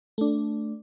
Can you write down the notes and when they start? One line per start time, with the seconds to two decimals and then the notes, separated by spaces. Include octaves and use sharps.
0.18 A3 D4